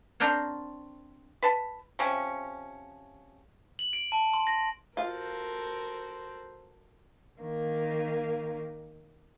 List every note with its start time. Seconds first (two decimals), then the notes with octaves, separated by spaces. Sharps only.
0.20 C4 D4 A#4 C5 C#5
1.42 B4 A5 B5
1.99 C3 F3 C#4
3.79 F#7
3.93 D7
4.12 A5
4.34 C6
4.47 A#6
4.97 F4 F#4 A4 A#4 C5 F5
7.40 D#3 A#3